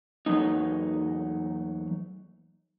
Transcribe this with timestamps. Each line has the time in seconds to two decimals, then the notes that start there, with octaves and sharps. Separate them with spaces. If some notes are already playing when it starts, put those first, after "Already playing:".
0.26 E2 F#3 A3 A#3 D#4